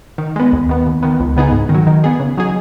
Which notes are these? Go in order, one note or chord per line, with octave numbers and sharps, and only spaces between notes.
D#3
G#3 B3
D#2
D#3 B3
D#2
D#3 B3
C#2
C#3 B3 D#4 G#4
G#2
D#3
F#3
D#3
B3 G#4
C#3
F#3 D#4 G#4